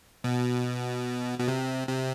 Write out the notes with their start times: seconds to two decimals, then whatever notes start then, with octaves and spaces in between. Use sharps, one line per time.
0.24 B2
1.39 B2
1.48 C3
1.88 C3